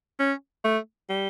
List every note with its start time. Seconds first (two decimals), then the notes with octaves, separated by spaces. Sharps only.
0.20 C#4
0.65 A3
1.10 G3